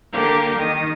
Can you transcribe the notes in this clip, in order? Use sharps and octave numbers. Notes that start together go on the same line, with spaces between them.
D3 A#3 G4 A#4
D#3 D#6